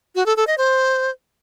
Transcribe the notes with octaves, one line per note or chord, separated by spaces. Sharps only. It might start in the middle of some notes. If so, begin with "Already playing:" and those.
F#4
A4
A4
D#5
C5